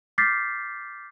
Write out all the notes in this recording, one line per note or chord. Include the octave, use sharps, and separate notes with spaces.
D6 F6 G6 A6 B6 C7